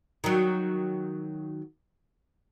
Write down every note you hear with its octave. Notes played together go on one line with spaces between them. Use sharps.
D#3 F#3